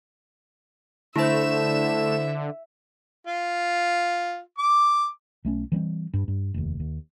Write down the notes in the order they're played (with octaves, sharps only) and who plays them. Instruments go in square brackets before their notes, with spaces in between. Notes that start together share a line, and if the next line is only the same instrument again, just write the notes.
[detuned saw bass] D3 [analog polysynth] A3 E7 [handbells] E4 C5 [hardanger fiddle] E5
[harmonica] F4
D6
[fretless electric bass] B1 A3 C#4
E3 G3 B3 C4
G2
G2
F1 D#2
D#2